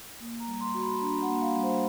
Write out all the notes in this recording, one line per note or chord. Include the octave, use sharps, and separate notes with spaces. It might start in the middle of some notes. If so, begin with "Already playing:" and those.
A#3
A#5
G3
C6
F#4
B5
D4 A#5
F#5
A#3
F5
G3
C5